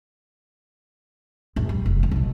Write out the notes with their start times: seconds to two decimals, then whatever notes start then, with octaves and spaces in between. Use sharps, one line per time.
1.56 A#1 F2
1.69 G3
1.86 F1
1.99 D2 C#3
2.12 B1 A#2